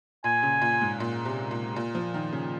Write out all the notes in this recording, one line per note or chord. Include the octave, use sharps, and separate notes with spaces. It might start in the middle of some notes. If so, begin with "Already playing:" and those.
A#2 G#5
C#3
A#2
G#2
A#2
C3
A#2
A#2
F3
D#3
C#3